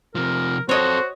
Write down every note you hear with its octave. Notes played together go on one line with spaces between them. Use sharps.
C3 F3 A#4
C4 F#4 A4 C5 C#5 D#5